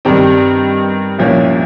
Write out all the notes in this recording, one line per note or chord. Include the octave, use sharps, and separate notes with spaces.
G2 D#3 G3 C4
C2 A#2 F3 A#3 C#4